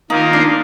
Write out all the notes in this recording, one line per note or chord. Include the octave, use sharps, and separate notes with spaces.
D#3 A#3 D#4 F4 A#4
D4